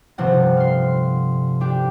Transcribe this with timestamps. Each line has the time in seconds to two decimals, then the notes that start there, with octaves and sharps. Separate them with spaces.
0.18 G1 C3 F3 C4 C#4 F#5
0.57 F5 C6
1.61 D4 G4